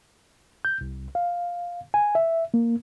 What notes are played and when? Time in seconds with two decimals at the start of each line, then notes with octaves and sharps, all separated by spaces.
0.65 G6
0.81 C2
1.15 F5
1.94 G#5
2.15 E5
2.54 A#3